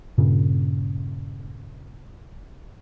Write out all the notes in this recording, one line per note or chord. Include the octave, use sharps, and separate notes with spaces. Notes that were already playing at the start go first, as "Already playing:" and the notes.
G2 A#2 C#3